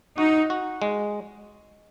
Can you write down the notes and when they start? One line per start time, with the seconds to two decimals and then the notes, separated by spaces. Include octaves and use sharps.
0.18 D#4 F#4
0.50 F#4
0.82 G#3